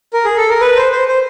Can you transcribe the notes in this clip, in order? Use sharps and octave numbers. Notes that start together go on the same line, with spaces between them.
A#4
G#4
A4
A#4
B4
C5
C5
C5